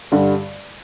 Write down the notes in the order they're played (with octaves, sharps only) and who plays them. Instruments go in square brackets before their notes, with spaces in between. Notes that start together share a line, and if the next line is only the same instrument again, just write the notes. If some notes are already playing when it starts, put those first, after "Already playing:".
[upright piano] G2 D3 G3